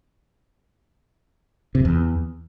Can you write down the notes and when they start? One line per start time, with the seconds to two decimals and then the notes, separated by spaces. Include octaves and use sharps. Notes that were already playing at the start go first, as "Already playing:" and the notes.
1.75 C3
1.80 F2
1.85 E2